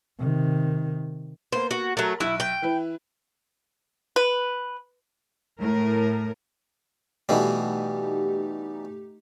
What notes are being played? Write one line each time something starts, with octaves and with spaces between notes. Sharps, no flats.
C3 D#3
A#3 B3 C5
F#4
F#3 A3 A#4
B1 E4 E5 F#6
G5
E3 E4 B4
B4
A2 A#4
B2 E3 G3 A3 D#4 G4